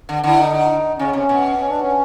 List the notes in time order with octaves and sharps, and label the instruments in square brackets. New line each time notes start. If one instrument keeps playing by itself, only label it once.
[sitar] D3
[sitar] D3 [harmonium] E4
[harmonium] D#4
[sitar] C#3 [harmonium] C#4
[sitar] C3
B2
[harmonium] C#4
D4
C#4